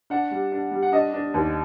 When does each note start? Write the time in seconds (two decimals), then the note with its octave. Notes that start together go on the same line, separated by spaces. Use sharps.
0.10 D4 F#5
0.31 G3
0.52 D4
0.71 G3
0.82 F#5
0.92 D4 D#5
1.14 D4
1.34 D#2